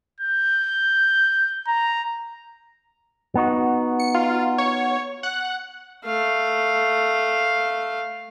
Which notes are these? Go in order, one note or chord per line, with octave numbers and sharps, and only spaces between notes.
G6
A#5
B3 D#4 F#4
C#7
F4
C#5
F#5
A3 F5